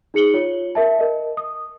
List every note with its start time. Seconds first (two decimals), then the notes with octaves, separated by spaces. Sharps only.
0.14 D#4 G#4 C#7 F#7 G7
0.34 F4 C#5
0.75 A#4 E5 A5
0.99 A#4 D#5
1.37 D#6